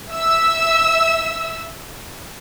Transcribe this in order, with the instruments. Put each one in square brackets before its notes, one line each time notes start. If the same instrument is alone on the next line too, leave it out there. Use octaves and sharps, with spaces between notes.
[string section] E5 E6